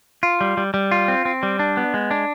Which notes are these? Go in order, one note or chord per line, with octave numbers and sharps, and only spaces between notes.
F4
G3
G3
G3
F4
C4
C4
G3
D4
B3
G#3
D4